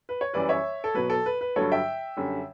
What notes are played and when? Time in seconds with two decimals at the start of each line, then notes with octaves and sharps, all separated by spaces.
0.09 B4
0.21 C#5
0.34 F#2 E3 G3 B4 D5
0.49 C#5 E5
0.84 A4
0.94 B2 F#3 B4
1.10 A4
1.26 B4
1.41 B4
1.56 G2 D3 F#3 A4 C#5
1.71 E5 G5
2.17 F#2 D3 G3